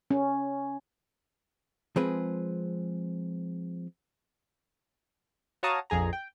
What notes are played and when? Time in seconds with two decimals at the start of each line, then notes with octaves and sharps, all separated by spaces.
0.11 C#4
1.96 F3 G#3 C4 G#4 B4
5.63 F#4 C#5 F5 A5 A#5 D#6
5.90 A#1 F2 G#4 A#5
6.13 G5